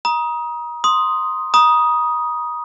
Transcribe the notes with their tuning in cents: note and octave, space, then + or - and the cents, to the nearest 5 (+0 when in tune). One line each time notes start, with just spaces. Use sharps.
A#5 +35 D#6 +10
C6 +0 D#6 +0
A#5 +45 D#6 +0